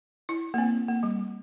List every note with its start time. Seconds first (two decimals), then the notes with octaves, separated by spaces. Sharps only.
0.29 E4
0.54 A#3
0.58 C4
0.88 A#3
1.03 G3